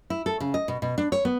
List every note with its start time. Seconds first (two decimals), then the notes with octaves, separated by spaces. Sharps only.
0.10 E4
0.26 A4
0.40 C#3
0.54 D#5
0.68 B2
0.82 B2
0.98 D4
1.12 C#5
1.25 B3